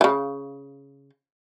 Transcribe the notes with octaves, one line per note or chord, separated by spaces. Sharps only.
C#3 E3